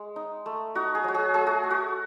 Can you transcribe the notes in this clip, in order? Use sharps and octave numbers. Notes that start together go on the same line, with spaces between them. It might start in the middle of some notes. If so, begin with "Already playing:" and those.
Already playing: G#3
D#4
A3
D#4 F#4
G#4
F#3 F#4
G#4
A3 G#4
F#4
A3
F#4